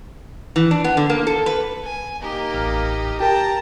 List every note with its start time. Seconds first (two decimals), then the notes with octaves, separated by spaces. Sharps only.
0.56 E3
0.71 D4
0.84 B3
0.97 D3
1.10 A#3
1.27 A4
1.46 B4
1.84 G#5
2.22 A#3 D#4 G4
2.54 A1 F6
3.20 G4 A#4 G5 A5 A#5